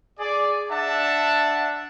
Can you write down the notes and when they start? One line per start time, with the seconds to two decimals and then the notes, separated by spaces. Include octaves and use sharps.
0.19 G#4 D5
0.70 D4 E5 F#5 A5